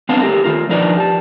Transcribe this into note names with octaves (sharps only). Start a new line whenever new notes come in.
B3 C4 D4 B4 F5 A5
A3 G4 A#4
D#3 F4 A#4
F3 D4 D#4 A#4 B4 D5
G4 G#5 A5